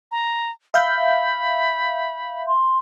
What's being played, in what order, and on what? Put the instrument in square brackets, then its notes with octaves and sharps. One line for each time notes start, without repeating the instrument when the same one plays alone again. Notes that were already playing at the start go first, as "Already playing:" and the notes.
[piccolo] A#5
[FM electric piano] E5 F5 G6 [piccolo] B5
[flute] C6